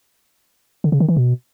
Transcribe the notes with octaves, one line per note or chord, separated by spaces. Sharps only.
D3
C#3
D#3
E3
B2